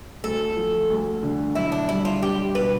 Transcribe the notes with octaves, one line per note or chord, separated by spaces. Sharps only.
D2 A4
F3
D2
D3
B1 E4
D4
G3 E4
F4
D4 G4
B2 B4